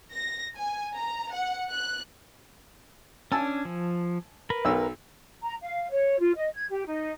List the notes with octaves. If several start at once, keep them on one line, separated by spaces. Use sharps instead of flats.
A#6
G#5
A#5
F#5
F#6
C#4 D4 G#5 A5 E6
F3
A#4 B4 B5
B1 E6
A#5
F5
C#5
F4
D#5
G#6
G4
D#4